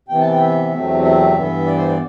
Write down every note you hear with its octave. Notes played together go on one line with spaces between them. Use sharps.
C3 E3 B3 G5
A5
G5
E5
E2 C3 F#3 A3 C4
E5
G2 E3 B3
D5
C5
D5